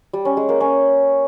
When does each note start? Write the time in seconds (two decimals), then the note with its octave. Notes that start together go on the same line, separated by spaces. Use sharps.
0.13 G3
0.25 C#4
0.37 G#3
0.49 A#3
0.60 C#4